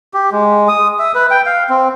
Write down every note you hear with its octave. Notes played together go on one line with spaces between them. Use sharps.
G4
G#3
D#6
E5
B4
G5
F5
C4